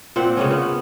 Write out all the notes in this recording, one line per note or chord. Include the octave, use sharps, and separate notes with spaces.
A#2 C4 F#5
C#3 B3 C#4
B3